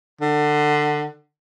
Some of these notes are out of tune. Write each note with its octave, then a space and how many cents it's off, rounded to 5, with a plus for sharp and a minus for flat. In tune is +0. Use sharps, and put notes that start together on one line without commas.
D3 +25